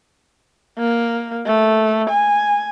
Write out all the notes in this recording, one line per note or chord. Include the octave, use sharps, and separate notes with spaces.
A#3
A3
G#5